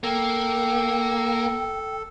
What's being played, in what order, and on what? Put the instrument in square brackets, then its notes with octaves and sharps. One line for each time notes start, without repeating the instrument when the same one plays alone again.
[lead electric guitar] A#3 [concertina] A4 [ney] G5